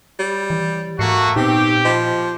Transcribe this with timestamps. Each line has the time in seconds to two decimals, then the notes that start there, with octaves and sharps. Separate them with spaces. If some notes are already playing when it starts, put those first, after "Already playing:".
0.19 G3 C#5
0.50 E3
0.99 G#2 A3 A#3 F#4 C#6 C7 C#7
1.36 A#2 B3 C4 D#4 G4
1.85 F3 D#5 B5